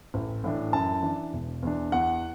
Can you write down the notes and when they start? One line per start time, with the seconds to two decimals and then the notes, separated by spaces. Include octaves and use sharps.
0.14 A1
0.44 A2 E3 D4
0.73 F#2 A5
1.02 E3 D4
1.33 E1
1.62 E2 E3 D4
1.92 E2 F#5